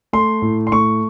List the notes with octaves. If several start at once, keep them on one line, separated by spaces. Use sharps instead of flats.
A3 C6
A2
C6
A3 C#6